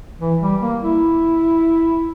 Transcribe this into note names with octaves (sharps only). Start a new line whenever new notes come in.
E3
G3
A#3
E4